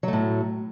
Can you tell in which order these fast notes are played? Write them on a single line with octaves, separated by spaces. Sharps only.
F#3 A3 A2